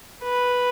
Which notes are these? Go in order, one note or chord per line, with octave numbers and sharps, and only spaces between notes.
B4